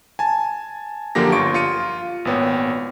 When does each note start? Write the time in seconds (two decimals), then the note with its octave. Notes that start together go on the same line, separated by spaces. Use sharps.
0.19 G#5 A5
1.15 F#2 D3 F3 A#3 G4 A#6
1.32 G1 F4 C#6 D7
1.54 F4 C#7 D#7
2.25 G#1 A#2 B3 C#5 G5